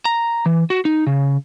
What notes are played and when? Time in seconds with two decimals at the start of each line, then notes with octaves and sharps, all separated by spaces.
0.05 A#5
0.46 E3
0.70 F#4
0.85 D#4
1.07 C#3